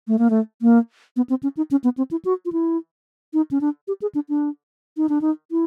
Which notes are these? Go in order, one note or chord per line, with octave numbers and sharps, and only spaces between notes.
A3
A#3
A3
A#3
B3
C4
C#4
D#4
C#4
B3
C4
E4
F#4
F4
E4
D#4
C#4
D4
G4
G#4
D4
D4
D#4
D4
D#4
E4